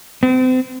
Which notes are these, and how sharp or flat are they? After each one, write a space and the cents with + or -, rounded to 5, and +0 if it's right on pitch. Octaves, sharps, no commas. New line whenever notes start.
C4 -35